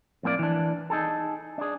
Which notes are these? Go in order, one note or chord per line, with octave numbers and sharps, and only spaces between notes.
F2 A2 A#3 G4 D5
E3 D4
D#4 G#4 A4
D4 G#4